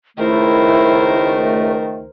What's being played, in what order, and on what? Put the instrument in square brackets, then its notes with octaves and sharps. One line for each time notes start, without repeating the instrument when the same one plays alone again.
[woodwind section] C#2 D#3 A3 [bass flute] E4 [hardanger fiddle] A#4 C5